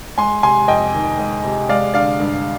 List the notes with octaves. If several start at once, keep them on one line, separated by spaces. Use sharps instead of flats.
G#3 G#5 C6
C3 G#5 C6
F2 D#5 G5
D#3
G#3
C3
G#3 D5 F5
D3 D5 F5
G2